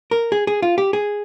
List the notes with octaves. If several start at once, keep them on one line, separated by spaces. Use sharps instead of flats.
A#4
G#4
G#4
F4
G4
G#4